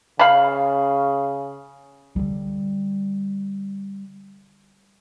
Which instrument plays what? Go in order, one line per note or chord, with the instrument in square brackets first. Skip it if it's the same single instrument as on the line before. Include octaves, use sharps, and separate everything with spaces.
[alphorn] C#3 [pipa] F5 B5
[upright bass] D3 G3